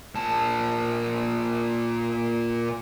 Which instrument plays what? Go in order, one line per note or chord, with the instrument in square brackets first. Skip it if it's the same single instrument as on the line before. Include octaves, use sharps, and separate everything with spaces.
[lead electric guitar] A#2 A5